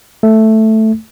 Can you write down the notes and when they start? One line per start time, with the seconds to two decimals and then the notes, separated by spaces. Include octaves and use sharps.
0.23 A3